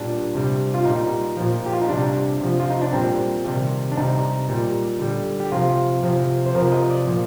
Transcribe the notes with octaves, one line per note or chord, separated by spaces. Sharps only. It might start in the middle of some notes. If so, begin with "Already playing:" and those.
Already playing: A#2 G3 D4
C3 G3
F4
A#2 G3 D#4
A#2 F3
G4
F4
D#4
C3 G3 D4
C3 F3
F4
D#4
D4
A#2 G3 C4
C3 D#3 G3
D4
C3 G3 D#4
A#2 G3
D3 G3
G4
C3 F3 F4
C3 F3
C5
C3 F3 A#4
D#5
D5
A#2 F3